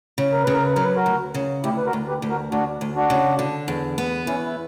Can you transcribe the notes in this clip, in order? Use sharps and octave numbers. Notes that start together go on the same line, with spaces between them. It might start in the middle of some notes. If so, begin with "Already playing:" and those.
C#3
A#4
C#3 B4
A#4
B4
F#3 A#4
B4
F#4 A#4
D2
C#3
D2 E4 G4
B4
F#4 A#4
D2
G4 B4
D2
F#4 A#4
D2 D4 F#4
D2
D4 F#4
C#3
D3
E2
B3
E2 C#4 E4
E4